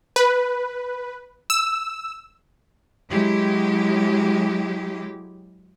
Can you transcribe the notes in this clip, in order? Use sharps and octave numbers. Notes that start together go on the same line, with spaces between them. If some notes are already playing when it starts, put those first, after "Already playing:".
B4
E6
F#3 G#3 E4 G4